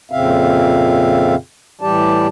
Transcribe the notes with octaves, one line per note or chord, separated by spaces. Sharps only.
F2 A#2 C#3 C4 E5 F5
A2 E3 G3 G4 D5 A5